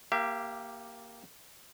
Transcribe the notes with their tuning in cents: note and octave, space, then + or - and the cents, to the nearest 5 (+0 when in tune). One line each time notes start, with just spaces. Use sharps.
A#3 +0 G4 +0 E5 +45